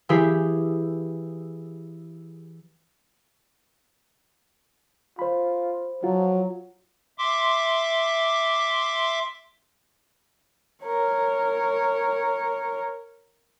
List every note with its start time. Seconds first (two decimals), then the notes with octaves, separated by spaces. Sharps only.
0.09 E3 E4 G4 G#4
5.19 F4 C5 B5
6.04 F3 F#3 F4
7.18 E5 C6 D6
10.85 A#4 C#5